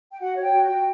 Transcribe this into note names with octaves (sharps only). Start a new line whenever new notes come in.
G5
F#4 F#5
C#5
G5
F#4
G5
F#4